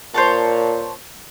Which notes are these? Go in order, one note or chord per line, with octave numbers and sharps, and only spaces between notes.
A#2 C5 C#5 A5